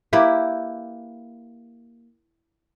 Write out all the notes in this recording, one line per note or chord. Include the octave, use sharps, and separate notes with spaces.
A#3 E4 G4 B4